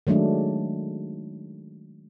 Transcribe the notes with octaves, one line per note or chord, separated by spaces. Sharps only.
D#3 F#3 G#3 A3 D4